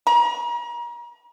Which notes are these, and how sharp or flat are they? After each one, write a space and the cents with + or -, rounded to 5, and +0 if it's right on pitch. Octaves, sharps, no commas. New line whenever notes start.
A#5 +35